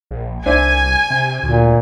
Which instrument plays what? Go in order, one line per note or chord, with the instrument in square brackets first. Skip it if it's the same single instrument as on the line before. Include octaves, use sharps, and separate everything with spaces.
[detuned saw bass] A#1
[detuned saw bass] C2 [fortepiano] D4 C5 E5 [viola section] G#5
[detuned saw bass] C3
[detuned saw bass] D2 [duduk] A#2